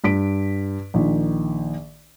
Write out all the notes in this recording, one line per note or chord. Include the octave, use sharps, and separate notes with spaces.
G2 B6 D7
A#1 D#3